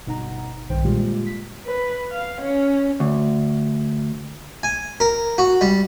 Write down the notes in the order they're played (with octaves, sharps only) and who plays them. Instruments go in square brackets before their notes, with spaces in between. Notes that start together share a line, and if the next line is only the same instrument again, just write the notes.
[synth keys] G1 B2 D#4 F#5 A#5
B1 G2 D#3 C5 G5
A#2 D3 G3 G#3 F4 G4
B6
[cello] B4
F5
C#4
[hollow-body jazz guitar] D2
[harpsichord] G#5
A#4
F#4
G3